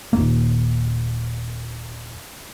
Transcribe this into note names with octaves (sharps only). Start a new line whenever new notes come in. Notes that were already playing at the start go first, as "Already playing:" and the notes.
D#1 A#3